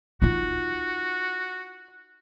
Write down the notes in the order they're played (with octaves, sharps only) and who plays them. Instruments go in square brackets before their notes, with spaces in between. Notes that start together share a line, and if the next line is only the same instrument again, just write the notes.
[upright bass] D#4 F4 [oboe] F#4